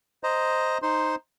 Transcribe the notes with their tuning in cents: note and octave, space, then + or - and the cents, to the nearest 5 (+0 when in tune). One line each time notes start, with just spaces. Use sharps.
C5 +0 D#5 +0 A#5 +0
D#4 +0 C5 +0 C6 +0